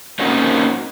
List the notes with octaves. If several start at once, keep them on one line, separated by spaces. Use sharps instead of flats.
A#3 C4 C#4 D#4 F#4